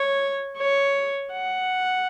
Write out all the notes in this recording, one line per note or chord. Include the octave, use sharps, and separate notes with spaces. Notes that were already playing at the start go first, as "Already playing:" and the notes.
Already playing: C#5
C#5
F#5